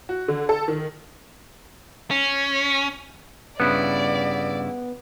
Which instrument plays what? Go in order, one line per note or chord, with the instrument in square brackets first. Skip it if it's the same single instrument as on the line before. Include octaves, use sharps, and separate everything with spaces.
[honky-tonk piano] F#4
D3
A4
D#3
[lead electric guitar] C#4
[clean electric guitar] G2 C#3 E4 [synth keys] B3 [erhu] D5